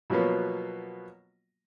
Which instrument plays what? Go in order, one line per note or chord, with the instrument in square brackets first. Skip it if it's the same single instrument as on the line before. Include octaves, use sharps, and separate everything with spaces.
[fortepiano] B2 F3 F#3 A#3 B3